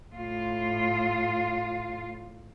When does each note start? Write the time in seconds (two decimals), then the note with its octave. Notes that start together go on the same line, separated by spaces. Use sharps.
0.15 A2 F4